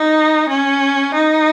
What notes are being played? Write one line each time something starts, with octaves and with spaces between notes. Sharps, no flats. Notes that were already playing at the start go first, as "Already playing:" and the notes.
Already playing: D#4
C#4
D#4